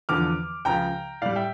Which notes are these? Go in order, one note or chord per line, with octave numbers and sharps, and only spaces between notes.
E2 D3 F3 D6 F6
C#2 C#3 F3 G5 A#5
A2 G3 D5 F5
E5 G5